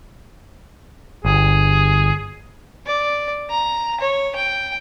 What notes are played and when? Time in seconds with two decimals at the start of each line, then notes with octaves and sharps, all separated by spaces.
1.25 G1 G#4
2.87 D5
3.50 A#5
4.00 C#5
4.35 G5